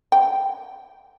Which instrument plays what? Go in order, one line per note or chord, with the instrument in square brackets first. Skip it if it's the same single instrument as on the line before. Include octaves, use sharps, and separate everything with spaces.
[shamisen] G5